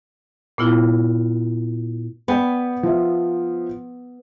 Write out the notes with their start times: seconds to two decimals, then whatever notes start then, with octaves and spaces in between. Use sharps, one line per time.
0.58 A#2 B3 E4 F4
2.28 B3 D5 G5 B5
2.83 F3 E5